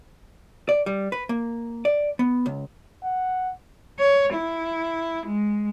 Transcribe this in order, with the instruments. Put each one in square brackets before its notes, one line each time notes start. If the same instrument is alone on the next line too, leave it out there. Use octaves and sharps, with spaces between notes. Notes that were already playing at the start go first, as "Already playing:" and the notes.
[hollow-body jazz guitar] D5
G3
B4
A#3
D5
B3
C#2
[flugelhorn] F#5
[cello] C#5
E4
G#3